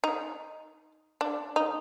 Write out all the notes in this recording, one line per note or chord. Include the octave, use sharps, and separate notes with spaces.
D#4
D4
D#4